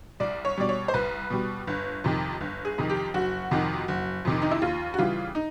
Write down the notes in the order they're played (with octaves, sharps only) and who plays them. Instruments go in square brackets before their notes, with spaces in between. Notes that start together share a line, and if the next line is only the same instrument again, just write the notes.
[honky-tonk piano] C2 D5
C#5
B2 G3 D5
C#5
C5
C2 B4
B2 G3
G1
F2 C3 D#3
G1
G#4
F2 C3 D#3
G4
F#1 F#4
F2 C3 D#3
F#1
F2 C3 D#3
D#4
E4
D#2 F4
F#4
C#3 E3 G3 F4
D#4